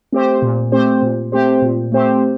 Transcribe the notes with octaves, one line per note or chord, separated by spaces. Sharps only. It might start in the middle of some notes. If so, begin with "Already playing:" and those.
A3 C4 G4 C5
A#2
A3 C4 G4 C5
A#2
A3 C4 G4 C5
A#2
A3 C4 G4 C5